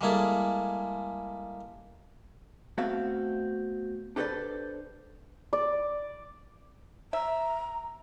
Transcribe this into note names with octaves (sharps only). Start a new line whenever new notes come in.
G3 G#3 A#3 E4 G#4 A4
A3 B3 C4 F#4 E5 F5
D4 G4 A4 B4 C5 D5
D5
E5 A#5